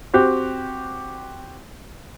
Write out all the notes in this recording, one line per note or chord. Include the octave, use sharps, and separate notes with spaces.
C4 F#4 G4